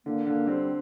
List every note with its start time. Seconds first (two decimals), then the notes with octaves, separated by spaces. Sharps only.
0.06 D3 A#3
0.27 D3 A#3
0.47 G3 C4